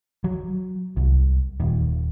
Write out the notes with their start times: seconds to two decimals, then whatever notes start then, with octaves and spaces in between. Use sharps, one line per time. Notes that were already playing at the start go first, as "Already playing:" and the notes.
0.24 F#3
0.97 C2
1.60 D#1